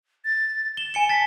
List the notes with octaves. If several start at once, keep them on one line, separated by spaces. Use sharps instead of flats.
A6
E7 G7
G#5 C#7 G7
A5 A6 B6